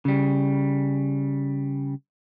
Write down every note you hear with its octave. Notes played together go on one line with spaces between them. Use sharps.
C#3 G3